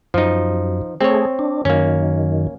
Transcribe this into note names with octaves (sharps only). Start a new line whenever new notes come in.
F#2 F3 D#4
A3 C4 G#4 C#5
D4
F#2 D#3 A#3 C#4